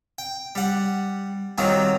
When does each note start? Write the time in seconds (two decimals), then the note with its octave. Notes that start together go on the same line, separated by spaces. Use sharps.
0.18 G5
0.55 G3 F#5
1.58 D#3 F#3 G3 C4 F4